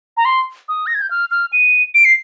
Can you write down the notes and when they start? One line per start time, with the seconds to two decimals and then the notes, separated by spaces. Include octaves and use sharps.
0.17 A#5
0.25 C6
0.69 D#6
0.87 A#6
0.95 G#6
1.02 G6
1.10 F6
1.31 F6
1.53 D#7
1.95 D7
2.05 C7